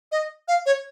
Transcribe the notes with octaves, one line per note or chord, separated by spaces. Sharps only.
D#5
F5
C#5